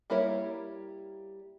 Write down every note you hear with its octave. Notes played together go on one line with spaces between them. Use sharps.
G3 A#3 E4 A#4 C#5